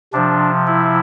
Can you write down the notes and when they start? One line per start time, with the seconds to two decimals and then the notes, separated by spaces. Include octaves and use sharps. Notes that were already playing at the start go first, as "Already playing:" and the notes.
0.13 C3 F3 D4
0.67 E4